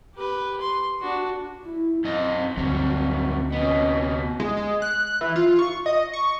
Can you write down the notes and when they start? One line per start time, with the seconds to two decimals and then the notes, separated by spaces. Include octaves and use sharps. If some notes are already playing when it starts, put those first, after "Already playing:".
0.16 G4 B4
0.61 C6
1.01 D4 F#4
1.64 E4
2.05 F#2 C4 D#5
2.57 D2 G2 F#3
3.52 C3 B3 C#4 D#5
4.40 G#3
4.57 G#3
4.82 F#6
5.21 E3
5.36 F4
5.59 C#6
5.86 D#5
6.13 C#6